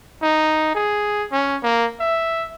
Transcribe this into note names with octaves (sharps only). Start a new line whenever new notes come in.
D#4
G#4
C#4
A#3
E5